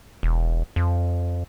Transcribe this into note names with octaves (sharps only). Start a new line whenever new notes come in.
E1
F2